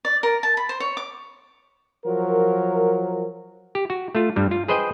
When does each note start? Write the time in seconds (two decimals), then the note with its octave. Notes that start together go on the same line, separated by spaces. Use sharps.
0.05 D5
0.23 A#4
0.43 A5
0.57 B5
0.69 C5
0.80 C#5
0.97 D6
2.06 F3 F#3 A#4
3.75 G4
3.90 F#4
4.15 A3 F4
4.36 G2 G3
4.51 F4
4.68 G#4 B4 C5 D#5 G5